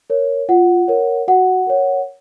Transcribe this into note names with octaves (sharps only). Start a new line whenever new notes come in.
A#4 C#5
F4 F#5
A#4 C#5
F#4 F#5
A#4 C#5